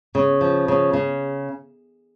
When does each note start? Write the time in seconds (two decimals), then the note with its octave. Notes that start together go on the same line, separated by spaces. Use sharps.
0.15 C#3
0.41 F3
0.68 C#3
0.93 C#3